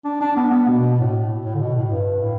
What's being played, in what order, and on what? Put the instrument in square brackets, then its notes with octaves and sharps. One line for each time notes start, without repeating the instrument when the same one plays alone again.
[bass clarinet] D4
D4
B3
B3
B2
A2
A2
D3
B2
A2
G2
A2